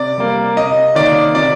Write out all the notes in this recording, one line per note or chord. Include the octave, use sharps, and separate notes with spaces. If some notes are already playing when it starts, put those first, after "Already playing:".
Already playing: C3 D5
G3 A#3
C3 D#5
D#3 A#3 D5
C3 D5